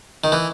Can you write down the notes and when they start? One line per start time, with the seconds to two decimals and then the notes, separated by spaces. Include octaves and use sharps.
0.24 D#3
0.32 E3